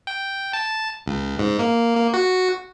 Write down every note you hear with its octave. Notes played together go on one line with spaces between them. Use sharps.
G5
A5
C#2
G#2
A#3
A#3
F#4